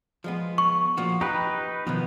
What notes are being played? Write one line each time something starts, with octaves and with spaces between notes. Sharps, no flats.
F3 G#3 B3
C#6
A#2 F3 F#4
D#4 G4 B4
B2 D#3 F3 B3